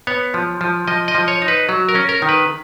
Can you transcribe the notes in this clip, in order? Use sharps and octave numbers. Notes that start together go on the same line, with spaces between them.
B3 C#5
F3
F3
F3 D#5
D#5
F3
C#5
D#4
B4
F#3
A#4
C#4
A#4
D#3
B4